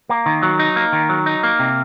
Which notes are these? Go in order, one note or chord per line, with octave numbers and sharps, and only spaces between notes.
A#3
D#3
F#3
D#4
A#3
D#3
F#3
D#4
A#3
C3